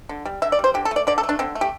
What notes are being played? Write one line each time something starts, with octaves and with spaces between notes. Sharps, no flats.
D3
G3
D3 E5
D5
G3 C5
D3 G4
A4
A3
D5
D3 D5
A4
A3
D4
D3 C4
A3
G4